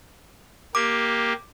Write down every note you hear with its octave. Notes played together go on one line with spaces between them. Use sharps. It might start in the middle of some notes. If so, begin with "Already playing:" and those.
A#3 G4 D6